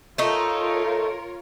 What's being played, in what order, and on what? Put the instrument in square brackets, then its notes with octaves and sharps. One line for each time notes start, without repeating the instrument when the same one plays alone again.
[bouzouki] A3 D#4 [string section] F4 A#4 C#5